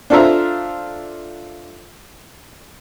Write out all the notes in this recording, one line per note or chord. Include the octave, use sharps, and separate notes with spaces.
D4 F4 A4 C5 E5 A#5